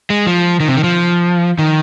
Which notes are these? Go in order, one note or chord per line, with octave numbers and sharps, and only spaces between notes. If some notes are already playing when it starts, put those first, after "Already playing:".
G#3
F3
D#3
C3
D#3
F3
D#3